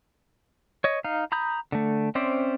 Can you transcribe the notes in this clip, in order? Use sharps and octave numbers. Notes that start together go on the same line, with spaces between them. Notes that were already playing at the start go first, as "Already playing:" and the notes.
C#5 D#5
D#4 F5
A#5 B5 D#6 G6
D3 A3
C4 C#4 C5 D5 E5